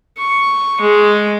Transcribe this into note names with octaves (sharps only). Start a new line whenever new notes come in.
C#6
G#3